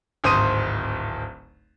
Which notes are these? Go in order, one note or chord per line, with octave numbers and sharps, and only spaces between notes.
D1 G#1 C5 D#6 D#7